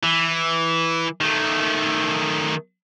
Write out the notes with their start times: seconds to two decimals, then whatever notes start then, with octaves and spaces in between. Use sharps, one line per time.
0.04 E3
1.20 D#3 A3